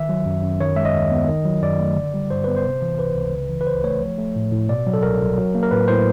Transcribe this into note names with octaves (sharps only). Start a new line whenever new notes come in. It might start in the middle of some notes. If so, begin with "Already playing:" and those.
Already playing: D#3 E5
F#3
F#2
F#2
D#3 C#5
G#3 E5
D#5
D#2
B3
D#3
F#3
F#2 D5
A3
D3
G3
G2 C5
B3 B4
C5
C3
E3
C#2 B4
C#2
C#3
E3
B4
D2 C5
A3 C#5
F3
A3
A2
A2
B2 D5
F#3
A4
C2 A#4
C2
F#3
A#3
A#4
A2 B4
A2 C5